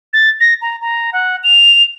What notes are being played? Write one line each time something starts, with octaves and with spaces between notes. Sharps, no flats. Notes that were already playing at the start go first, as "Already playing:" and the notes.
A6
A#6
A#5
A#5
F#5
F7